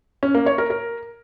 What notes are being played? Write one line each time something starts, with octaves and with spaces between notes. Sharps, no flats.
C#4
A#3
C#5
A#4
A#4